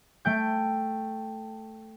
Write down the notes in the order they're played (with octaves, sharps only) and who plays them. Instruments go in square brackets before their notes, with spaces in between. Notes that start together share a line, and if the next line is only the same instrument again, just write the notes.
[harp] A3 G5 G6